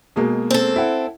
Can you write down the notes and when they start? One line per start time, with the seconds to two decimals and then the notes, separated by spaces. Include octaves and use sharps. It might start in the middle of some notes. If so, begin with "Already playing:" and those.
0.16 B2 G#3 A#3
0.51 C4 A4
0.76 E4 F#5